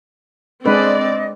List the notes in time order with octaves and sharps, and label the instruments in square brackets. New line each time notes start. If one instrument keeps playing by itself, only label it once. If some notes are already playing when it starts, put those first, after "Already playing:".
[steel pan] G#3 D4 B4 [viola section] C4 D5 [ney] D#5